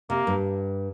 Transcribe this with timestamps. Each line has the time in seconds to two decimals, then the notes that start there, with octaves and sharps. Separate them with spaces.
0.10 C3 A#3
0.27 G2